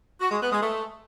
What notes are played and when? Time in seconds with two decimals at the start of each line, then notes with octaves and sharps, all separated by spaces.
0.21 F#4
0.31 G#3
0.42 B3
0.52 G#3
0.62 A3